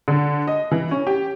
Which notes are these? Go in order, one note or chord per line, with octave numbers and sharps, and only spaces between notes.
D3
D#5
E3
C#4
G4